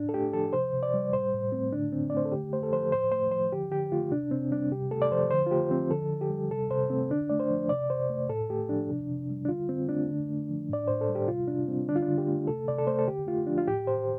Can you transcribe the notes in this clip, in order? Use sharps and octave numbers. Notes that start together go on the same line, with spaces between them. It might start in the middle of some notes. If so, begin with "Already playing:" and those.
Already playing: A2 D4
A4
A3 G4
F3 A4
C3 C5
C3
D5
G3
A2 C5
A2
A3 C4
D3 D4
D3 C4
D5
A3 C5
A4
D3 G4
A3 C5
A4
F3 C5
A2 C5
A3 C5
F3 C5
D3 G4
D3 G4
A3 F4
C3 D4
C3 C4
G3 D4
C3 G4
A3 A4
D5
F3 C5
D3 C5
F4
A3 G4
F3 C4
D3 A4
D3
G4
G3
C3 A4
C3 C5
A3 C4
D3 D4
A3 D5
C5
F3
C3 D5
C3 C5
A3
A2 A4
A3 G4
F3 D4
C3
C3
G3
D4
D3 F4
D3 C4
A3 D4
D3
A3
F3
A2 D5
A2 C5
A4
G3
G4
C3 F4
C3 D4
G3 C4
D3 D4
F4
D4
D3
G4
A3
C3 A4
C3 D5
A4
A3 C5
A4
D3 G4
A3 F4
F3 D4
F4
A2 G4
A2 C5